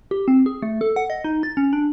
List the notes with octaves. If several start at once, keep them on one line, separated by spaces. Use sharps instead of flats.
G4
C4
G#4
A3
A4
F#5
D#5
D#4
A6
C#4
D4